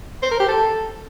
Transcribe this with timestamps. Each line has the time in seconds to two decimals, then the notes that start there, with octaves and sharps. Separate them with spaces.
0.23 C5
0.31 A#4
0.40 G4
0.48 A4